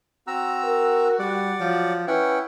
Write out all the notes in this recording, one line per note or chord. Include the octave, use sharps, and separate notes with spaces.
C4 F#4 A#5 E6
A#4
G3 D5 F#5 D6
F3 F#3
C#4 E4 B4 F#5 G5